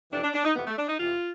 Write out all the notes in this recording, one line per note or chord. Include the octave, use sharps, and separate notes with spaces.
F2 C3 E3 D4
D4
D4
D#4
F2 C3 E3 B3
A3
D4
D#4
E2 C3 E3 F4